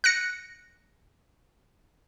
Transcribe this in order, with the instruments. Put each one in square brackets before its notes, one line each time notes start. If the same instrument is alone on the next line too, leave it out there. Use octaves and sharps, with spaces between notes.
[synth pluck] F#6 A#6 C#7